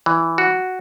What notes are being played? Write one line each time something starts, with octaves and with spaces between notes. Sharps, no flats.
E3
F#4